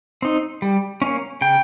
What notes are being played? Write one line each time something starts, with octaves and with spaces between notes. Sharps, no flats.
C4 D#4
G3
A#3 C#4
C#3 G5